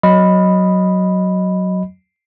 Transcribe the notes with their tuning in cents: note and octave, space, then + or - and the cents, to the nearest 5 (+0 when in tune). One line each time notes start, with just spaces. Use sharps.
F#3 +0 D#5 +0 B5 +0